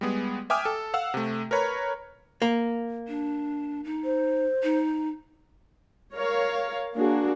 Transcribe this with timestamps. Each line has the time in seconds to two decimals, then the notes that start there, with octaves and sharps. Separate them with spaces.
0.01 G3 G#3 B3 G#4
0.50 E5 G5 G#5 D6 D#6 F6
0.65 A4
0.94 F5 F#5 E6
1.14 C3 A3
1.51 A#4 B4 C#5 A#5 B5
2.42 A#3
3.08 D4
3.84 D#4
4.04 C5
4.63 D#4
6.14 A#4 C#5 F5
6.94 A#3 D4 F#4 G#4